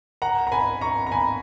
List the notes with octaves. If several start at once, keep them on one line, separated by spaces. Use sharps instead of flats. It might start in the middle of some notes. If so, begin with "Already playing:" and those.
F#5 A#5
A#5
G#5 B5
A#5 C#6
A#5
G#5 B5